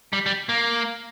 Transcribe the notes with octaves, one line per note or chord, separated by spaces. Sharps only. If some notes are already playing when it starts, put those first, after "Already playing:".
G3
G3
A#3